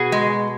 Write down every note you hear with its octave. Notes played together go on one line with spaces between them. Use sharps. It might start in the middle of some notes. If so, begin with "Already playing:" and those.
Already playing: B2 F#4 G#4
G#3